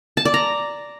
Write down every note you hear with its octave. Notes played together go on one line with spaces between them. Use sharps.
A5
D5
A#5